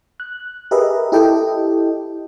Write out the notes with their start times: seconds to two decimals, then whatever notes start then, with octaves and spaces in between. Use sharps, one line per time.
0.20 F#6
0.71 G4 G#4 A#4 B4 D#5 E5
1.12 E4 G4 A4 D#5 G5